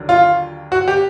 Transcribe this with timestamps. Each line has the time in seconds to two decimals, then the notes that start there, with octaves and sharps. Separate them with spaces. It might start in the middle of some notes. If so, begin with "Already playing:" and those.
Already playing: D#2 D3 F#3
0.09 F4
0.72 F#4
0.88 G4